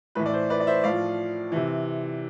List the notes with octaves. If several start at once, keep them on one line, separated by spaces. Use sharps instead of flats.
A2 E3 B4
D5
C5
B4 D5
D5
C5 E5
A2 F3 D5 F5
C3 E3